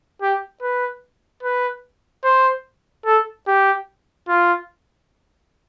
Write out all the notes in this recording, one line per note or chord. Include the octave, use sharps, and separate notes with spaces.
G4
B4
B4
C5
A4
G4
F4